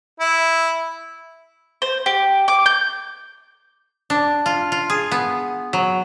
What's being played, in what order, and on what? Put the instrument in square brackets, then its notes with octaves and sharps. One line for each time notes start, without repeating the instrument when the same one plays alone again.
[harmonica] E4
[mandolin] C5
G4
D6
G6
[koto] D4
F4
F4
G#4
B3
F#3